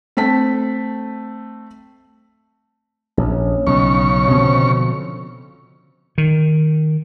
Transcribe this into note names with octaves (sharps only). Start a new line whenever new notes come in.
A3 C4 A5 B6
A#1 C#3
B1 C#3 C#4 D#5 B5 C#6
B2 D3 F3 C4
D#3